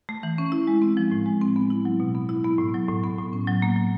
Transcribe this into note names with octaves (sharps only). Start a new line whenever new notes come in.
A3
E3
C#4
E4
G#3
C4
F3
A2
G#3
C4
B3
E4
F#3
B2
B3
E4
B3
A2
F#3
A2
B3
A2
C#4
F#3
A#3
F#3